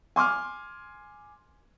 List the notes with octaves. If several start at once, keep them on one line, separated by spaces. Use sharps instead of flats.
G#5 C6 D6 F6